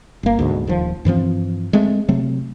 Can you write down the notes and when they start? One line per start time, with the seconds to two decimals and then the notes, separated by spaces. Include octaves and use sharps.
0.23 G1 A#3
0.39 D2 G#2 B2
0.67 D#1 D#2 F3
1.05 G2 E3 F3 C4
1.73 G#3 A3 C4
2.08 C3 F#3 A3 C4